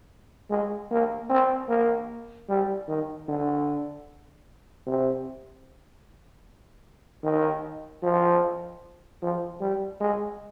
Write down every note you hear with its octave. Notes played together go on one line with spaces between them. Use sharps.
G#3
A#3
C4
A#3
G3
D#3
D3
C3
D#3
F3
F3
G3
G#3